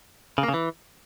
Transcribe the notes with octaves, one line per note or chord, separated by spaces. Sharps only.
C#3
A#3
C#3
E3